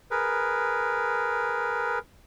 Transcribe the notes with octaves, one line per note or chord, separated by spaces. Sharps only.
G#4 A#4 B4